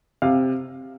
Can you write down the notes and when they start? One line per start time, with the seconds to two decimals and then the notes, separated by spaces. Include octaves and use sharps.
0.22 C3 F5